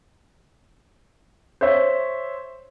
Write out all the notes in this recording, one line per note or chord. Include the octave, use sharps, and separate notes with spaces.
C5 C#5 E5